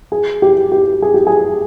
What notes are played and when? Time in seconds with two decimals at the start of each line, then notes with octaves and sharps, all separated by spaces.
0.12 G#4
0.42 G4
0.72 G4
1.02 G#4
1.14 G4
1.27 G#4